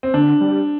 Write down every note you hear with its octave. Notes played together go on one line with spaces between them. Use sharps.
C4
D3 D4
G3